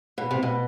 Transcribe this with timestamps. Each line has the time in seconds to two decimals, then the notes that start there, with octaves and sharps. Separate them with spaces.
0.18 B2
0.31 C3
0.43 B2